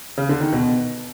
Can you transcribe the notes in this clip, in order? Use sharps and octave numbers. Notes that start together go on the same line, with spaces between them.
C#3
D3
D#3
B2